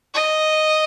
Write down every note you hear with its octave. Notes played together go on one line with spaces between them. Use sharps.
D#5